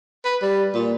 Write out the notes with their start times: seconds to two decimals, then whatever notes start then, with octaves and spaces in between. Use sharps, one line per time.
0.25 B4
0.42 G3
0.74 A#2